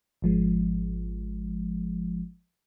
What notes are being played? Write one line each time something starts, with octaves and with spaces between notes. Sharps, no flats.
G#1 F3 G#3